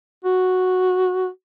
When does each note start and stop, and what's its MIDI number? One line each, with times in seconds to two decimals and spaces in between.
0.24 1.29 66